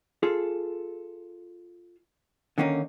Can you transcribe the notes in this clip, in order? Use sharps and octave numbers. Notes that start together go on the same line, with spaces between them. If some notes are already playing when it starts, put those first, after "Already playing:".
F4 G#4 A4
D3 D#3 A#3 C#4 D#4